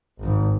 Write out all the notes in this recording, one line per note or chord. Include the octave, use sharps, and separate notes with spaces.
G#1